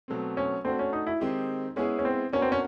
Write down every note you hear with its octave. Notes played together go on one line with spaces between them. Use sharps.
B2 F#3 A3 C4
C#4
A3 C4 D4 F#4
C#4
D#4
E4
D#3 G#3 C4 D#4 G4
G#3 B3 C#4 E4 G#4
C#4
C4
B3 C#4 D4 F#4 A#4 C#5
C4
C#4